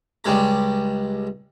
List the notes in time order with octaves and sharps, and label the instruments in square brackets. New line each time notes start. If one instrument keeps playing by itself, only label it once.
[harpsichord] C#2 G3 G#3 A#5